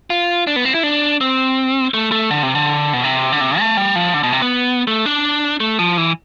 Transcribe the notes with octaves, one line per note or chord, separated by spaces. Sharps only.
F4
D4
B3
C4
E4
D4
C4
A3
A3
D3
C3
D3
B2
C3
D3
C3
A3
G3
F3
D3
B2
C3
B3
A3
D4
A3
F3
E3